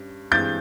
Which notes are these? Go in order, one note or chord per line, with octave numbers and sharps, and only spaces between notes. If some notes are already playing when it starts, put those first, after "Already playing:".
Already playing: G2 C#4
G2 E3 G#3 C4 G6 A6